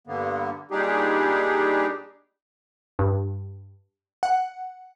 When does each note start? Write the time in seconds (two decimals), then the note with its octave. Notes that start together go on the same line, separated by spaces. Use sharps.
0.07 G2 D3 A#3 B3
0.71 A#2 G3 D4 D#4 G4 G#4
2.99 G2
4.23 F#5